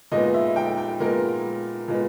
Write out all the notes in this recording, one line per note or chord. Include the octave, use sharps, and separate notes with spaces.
A#2 G#3 B3 D#5
E5
G5
G5
A#2 G#3 B3 A#4
A#2 G#3 B3